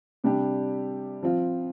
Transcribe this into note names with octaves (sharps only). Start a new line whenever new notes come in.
C3 G3 D4 G4
F3 C4 F4